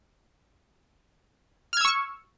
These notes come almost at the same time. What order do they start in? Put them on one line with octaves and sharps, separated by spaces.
F6 G#6 E6 C#6